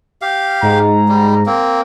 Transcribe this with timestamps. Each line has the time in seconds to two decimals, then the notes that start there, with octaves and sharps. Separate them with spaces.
0.22 G4 F5
0.63 G#2 A#5
1.09 G3
1.46 A#3 C4